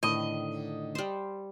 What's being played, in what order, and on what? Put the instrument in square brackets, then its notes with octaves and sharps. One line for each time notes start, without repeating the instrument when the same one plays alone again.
[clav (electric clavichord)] A2 [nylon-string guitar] D3 D#3 C4 [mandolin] D#5
[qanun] G3 C5